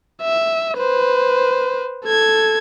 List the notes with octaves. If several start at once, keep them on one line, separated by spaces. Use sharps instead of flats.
E5
B4 C5
A4 G#6